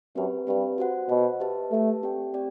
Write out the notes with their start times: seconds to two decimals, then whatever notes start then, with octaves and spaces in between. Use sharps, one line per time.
0.16 F#2 C4 G4 B4
0.47 G2 C4 G4 B4
0.78 F#4 C5 F#5
1.09 B2 F#4 C5 F#5
1.40 G4 B4 E5 A5
1.71 A3 G4 B4 E5 A5
2.03 C4 G4 D5 G5
2.34 C4 G4 D5 G5